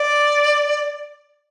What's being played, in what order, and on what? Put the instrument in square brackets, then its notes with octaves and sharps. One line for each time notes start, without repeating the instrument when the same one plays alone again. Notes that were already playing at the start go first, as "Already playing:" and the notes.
Already playing: [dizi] D5